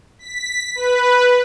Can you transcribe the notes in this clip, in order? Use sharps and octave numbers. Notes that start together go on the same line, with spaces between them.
B6
B4